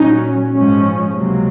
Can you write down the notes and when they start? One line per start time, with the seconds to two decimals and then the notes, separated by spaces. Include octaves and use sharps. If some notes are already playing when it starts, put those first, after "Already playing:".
Already playing: A#2 F#3 C#4 D#4
0.53 G#2 F3 G#3 C#4
1.14 C#2 C3 F#3 A#3